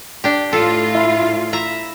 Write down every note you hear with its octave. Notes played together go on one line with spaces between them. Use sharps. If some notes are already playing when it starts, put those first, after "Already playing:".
D4 G4
A2 F4 A4
E4
E5 A#5